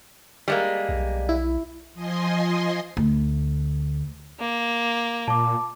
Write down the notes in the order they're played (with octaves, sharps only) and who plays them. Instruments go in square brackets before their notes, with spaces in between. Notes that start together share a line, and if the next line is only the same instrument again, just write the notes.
[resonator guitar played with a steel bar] G3 G#3 A#3
[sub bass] B1
[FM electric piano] E4
[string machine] F3 D#5 G#5 C6
[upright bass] D2
[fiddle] A#3
[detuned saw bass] A#2 [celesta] A5 D6